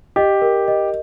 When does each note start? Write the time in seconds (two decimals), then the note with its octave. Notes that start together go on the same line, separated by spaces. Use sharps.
0.16 G4 D#5
0.42 A#4
0.68 D#5